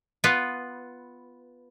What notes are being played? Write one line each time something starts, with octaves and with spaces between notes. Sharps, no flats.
B3 F4 B4